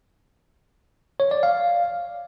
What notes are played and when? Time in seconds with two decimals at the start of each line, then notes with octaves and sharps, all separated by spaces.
1.20 C#5
1.31 D5
1.43 F5